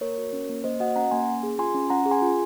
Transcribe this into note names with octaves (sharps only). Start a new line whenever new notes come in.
A#3 A#4 C#5
F#4
C#4
A#3
A#3 C5 D#5
F#4 D#5 F#5
C#4 F#5 A#5
A#3 G#5 C6
C#4
G#4
F4 G#5 C6
C#4
C#4 F#5 A#5
G#4
G#5 C6
F4